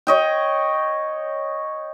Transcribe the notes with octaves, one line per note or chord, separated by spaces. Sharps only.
C#5 D#5 G5